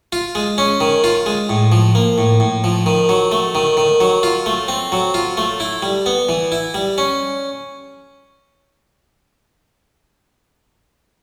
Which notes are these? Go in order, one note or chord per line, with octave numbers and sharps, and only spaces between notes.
F4
G#3
C#4
D#3
F4
G#3
A2
F3
A#3
A2
A2
F3
D#3
F#3
A3
D#3
D#3
F#3
F4
A3
C4
F#3
F4
A3
E4
G3
B3
E3
E4
G3
C#4